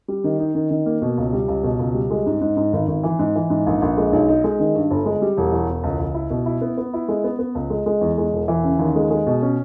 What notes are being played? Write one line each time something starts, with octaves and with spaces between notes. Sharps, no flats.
G3
D#3
D#4
D#3
D#3
A#3
B2
C#2
G3
C#2
B2
C#2
G3
G#3
G#2
G#2
G#2
G#1
G#1
E3
G#2
E3
G#2
A#1
A#1
G#3
B1
D#4
G#3
D#3
G2
G1
G#3
G3
E1
E2
E1
C#2
C#2
E4
B2
E4
B3
B3
E4
G#3
B3
B3
C#2
G#3
G#3
E2
G#3
E1
E3
C#3
D#2
G#3
G#3
B2
C#4